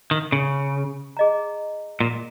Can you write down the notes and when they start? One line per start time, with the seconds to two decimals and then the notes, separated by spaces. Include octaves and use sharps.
0.11 D#3
0.32 C#3
1.17 G#4 D#5 A#5
2.00 A#2